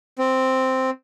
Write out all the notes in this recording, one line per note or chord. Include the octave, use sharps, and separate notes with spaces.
C4